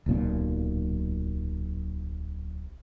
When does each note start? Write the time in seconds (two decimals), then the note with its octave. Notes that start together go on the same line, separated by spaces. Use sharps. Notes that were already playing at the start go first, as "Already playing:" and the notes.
0.06 D1 B1 A#2 B3